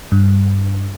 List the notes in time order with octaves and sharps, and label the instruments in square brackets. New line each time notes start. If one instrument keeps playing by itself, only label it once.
[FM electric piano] G2